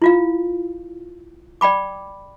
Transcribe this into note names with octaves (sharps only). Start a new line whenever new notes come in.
E4 F4 F5
D5 G5 B5 D6